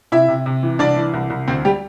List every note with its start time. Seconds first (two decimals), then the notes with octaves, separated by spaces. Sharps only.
0.12 C3 E4 E5
0.28 C3
0.46 C3
0.63 E3
0.79 C2 D4 D5
0.97 E3
1.14 C2
1.30 C2
1.48 D2 C4 C5
1.65 G3 G4